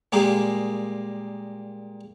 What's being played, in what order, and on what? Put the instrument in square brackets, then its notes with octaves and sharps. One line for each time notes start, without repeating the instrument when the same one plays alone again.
[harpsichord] A#2 G3 G#3 A#3 G4 G#4